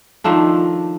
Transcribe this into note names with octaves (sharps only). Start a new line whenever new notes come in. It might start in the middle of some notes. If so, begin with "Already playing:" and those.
D#3 F3 A3 D4